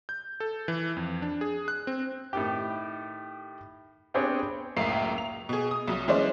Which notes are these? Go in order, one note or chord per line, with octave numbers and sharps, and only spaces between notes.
G6
A4
E3
F2
D4
G#4
F#6
C4
A2 D#3 G4
B3 C4 D4 G4 G#4 C#5
C#2 F#2 A2 A#3 C7
F7
B2 G#4
D#6
C2 F#3
E3 G#3 C#4 C5 D5